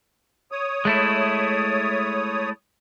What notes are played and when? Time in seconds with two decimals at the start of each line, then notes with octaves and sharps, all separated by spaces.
0.52 C#5 D#6
0.85 G#3 A3 E4